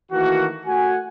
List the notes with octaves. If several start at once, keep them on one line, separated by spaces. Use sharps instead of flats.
D#3 E3 A3 A#3 F#4
A3 F#4 F#5 G#5